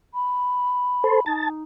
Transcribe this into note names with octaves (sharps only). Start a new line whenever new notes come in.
B5
A4 C5
D#4 A5